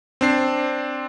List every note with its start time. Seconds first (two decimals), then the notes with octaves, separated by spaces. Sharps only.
0.21 C4 D4 C7